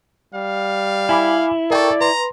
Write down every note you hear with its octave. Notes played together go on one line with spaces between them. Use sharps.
G3 F5
E4 G#5 B5 D6
A4 A#4 D5 G5 C#6
B4 A#5 C6